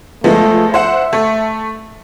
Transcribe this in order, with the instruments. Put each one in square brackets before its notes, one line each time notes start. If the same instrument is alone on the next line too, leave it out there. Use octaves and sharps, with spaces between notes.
[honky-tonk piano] F3 G#3 B3 [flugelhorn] A3
[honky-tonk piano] C5 F#5 [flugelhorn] E5
[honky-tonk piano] A3